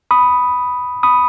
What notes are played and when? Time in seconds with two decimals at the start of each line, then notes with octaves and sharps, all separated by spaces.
0.11 B5 D#6
1.03 B5 D#6